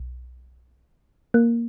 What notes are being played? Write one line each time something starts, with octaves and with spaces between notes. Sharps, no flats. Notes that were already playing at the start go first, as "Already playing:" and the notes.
Already playing: B1
A#3